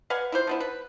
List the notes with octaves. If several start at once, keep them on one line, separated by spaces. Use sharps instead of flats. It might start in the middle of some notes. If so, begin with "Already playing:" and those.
B4 F5 F#5 G#5
E4 F4 C5
F3 B3 E4
B4